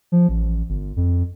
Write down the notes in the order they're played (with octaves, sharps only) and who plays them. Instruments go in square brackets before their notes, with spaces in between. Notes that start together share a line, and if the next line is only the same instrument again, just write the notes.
[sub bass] F3
A1
G1
F2